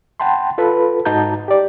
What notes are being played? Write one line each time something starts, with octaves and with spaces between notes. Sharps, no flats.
F#5 G5 A5 B5 C6
F4 A4 B4 B5
G#2 D#4 F#4 A5 A#5 G6
G4 D5